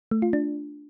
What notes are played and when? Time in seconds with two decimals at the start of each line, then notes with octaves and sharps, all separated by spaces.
0.11 A3
0.22 F4
0.33 D4